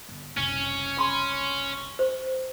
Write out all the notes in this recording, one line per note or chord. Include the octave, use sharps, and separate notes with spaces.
G1
F#1 C2 C#4
G5 B5 C6
C5